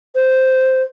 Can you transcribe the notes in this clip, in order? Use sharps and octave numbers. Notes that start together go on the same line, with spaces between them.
C5